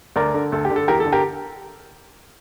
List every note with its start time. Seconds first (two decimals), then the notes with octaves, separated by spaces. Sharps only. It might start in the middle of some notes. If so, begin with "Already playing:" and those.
0.16 D2 A#4 D5
0.34 D3
0.52 D2 A4
0.65 G4
0.70 D3
0.76 A4
0.88 E2 G4 A#4
1.00 A4
1.06 D3
1.12 G4 A#4